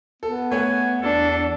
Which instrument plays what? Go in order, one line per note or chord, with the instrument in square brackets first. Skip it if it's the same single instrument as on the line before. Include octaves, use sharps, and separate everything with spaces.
[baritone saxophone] B3 [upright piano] A4
[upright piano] A3 C#5 F#5 [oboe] G#5
[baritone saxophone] E2 [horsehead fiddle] D4 [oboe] A4